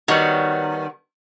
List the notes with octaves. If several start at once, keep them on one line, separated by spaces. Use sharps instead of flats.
D#3 G3 B3 F#4 C#5